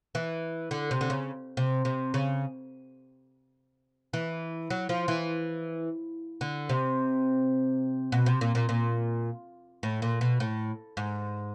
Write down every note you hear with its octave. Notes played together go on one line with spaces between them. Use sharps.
E3
D3
C3
D3
C#3
C3
C3
C#3
E3
F#3
F3
E3
D3
C3
B2
C3
A#2
A#2
A#2
A2
A#2
B2
A2
G#2